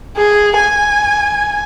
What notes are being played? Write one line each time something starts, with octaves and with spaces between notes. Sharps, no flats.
G#4
G#5